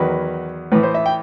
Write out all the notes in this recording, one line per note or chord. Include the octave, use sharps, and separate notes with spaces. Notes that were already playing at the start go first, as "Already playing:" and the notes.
Already playing: E2 D#3 F#3 B4
A2 E3 B4
C5
E5
G5